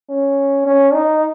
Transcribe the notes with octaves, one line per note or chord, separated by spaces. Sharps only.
C#4
C#4
D#4